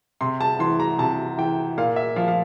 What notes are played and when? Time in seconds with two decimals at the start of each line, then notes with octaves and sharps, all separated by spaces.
0.21 C3 C6
0.41 A5
0.59 E3 C6
0.80 A#5
0.98 C3 A5
1.37 E3 G5
1.77 A#2 F5
1.96 E5
2.16 F3 F5
2.28 F5